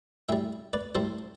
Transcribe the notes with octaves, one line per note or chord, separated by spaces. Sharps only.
A2 G3 E5 G5
B4 D5
A2 G3 A4 C5